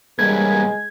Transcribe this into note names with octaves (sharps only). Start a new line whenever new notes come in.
C2 G2 G#3 A#3 B4 G#6